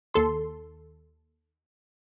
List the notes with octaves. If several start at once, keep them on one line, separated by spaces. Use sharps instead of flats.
D#2 A4 C6